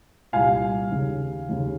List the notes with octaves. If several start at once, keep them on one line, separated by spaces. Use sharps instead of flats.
C2 A#2 F5 G#5
D#2 C#3
D#2 C#3